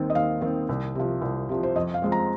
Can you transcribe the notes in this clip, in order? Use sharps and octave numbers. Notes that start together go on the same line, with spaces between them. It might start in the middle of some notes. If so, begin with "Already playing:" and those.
Already playing: D#2 D#3 C4
D#5
D#2 F5
D#3 C4
C2
C3 F3
C2
C3 F3
C5
F2 D#5
F5
F3 G#3 C4
A#5